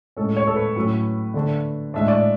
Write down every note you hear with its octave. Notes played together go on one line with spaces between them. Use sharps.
A2 G#3 C#4 A4
C#5
A4
B4
A2 F#3 C#4
D3 A3 D4
A2 G#3 D4 E5
D5